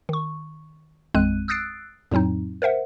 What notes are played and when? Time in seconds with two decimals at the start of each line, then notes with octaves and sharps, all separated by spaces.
0.09 D#3 C#6
1.14 A1 F2 G#3 C4 F#6 D#7
1.48 D#6 E6 F#6 A6 C7 D7
2.11 F2 A2 F#3 C4 D#4
2.62 A#4 C5 E5 F#5